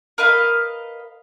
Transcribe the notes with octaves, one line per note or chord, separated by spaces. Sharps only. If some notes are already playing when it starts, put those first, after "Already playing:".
A#4 B4 D#5 F5